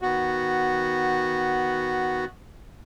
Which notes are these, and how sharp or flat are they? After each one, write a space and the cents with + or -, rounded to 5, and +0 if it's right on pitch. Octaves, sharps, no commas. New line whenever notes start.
D#3 +0 B3 +0 F#4 +0